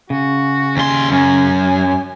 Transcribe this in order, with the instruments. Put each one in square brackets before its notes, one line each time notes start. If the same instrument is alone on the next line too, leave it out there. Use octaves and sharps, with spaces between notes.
[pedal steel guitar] C#3 [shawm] F#4
[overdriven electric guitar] D#2 C6 [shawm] G#5
[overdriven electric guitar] F#2 [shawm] G#5